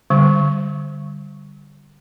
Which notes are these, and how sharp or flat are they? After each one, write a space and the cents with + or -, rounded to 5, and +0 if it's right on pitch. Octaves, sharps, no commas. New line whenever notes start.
D3 +0 G3 +0